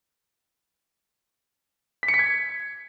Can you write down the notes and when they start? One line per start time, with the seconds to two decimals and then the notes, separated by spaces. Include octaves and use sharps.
2.03 B6
2.08 C#7
2.14 B6
2.19 G#6